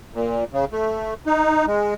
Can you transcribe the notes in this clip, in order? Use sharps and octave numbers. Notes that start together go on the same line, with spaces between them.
A#2
C#3
A3
D#4
G#3